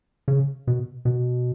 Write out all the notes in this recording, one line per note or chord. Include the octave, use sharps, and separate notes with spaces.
C#3
B2
B2